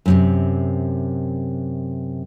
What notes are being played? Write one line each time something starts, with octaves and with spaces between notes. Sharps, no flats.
F#2 A2 C3